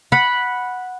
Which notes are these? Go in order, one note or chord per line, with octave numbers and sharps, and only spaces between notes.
F#5 B5